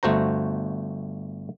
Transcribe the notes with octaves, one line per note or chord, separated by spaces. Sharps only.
G1 A3 F#4 C5 A#5